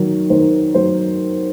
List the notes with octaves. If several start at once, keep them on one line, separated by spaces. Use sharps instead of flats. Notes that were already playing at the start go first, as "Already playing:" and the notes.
Already playing: D#3 F#3
D#3 C5
F#3 C5